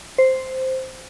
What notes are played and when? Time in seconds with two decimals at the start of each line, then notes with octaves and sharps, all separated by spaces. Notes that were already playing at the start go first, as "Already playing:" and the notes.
0.18 C5